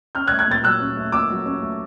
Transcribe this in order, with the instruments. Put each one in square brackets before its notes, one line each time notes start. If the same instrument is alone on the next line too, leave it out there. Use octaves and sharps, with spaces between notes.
[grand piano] C#4 F6 G6
F#6 G#6
A3
F#6 G#6
A#2 G6 A6
F#3 E6 F#6
C#4
A3
A#2 D6 E6
F#3
C#4
A3